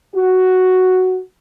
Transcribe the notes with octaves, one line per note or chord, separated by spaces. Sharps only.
F#4